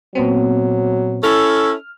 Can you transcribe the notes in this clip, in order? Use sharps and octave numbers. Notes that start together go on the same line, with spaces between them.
A#2 F#3 B3 C4
C#4 E4 A4 F6